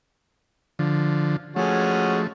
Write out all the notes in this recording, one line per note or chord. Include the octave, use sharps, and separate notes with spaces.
D3 F3
F3 G#3 A3 C#4 F#4